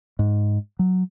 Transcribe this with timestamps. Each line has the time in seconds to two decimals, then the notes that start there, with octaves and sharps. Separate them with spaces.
0.19 G#2
0.79 F#3